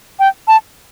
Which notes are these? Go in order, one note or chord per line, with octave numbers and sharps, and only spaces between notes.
G5
A5